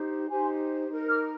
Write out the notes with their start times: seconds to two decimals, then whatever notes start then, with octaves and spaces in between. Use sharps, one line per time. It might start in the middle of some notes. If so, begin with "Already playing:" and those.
Already playing: D#4 G4 C5
0.29 D#4 G4 C5 G#5 C6
0.88 D#4 A#4
1.08 D6 F6